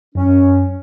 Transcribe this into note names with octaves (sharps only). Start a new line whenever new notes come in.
F#2 C#4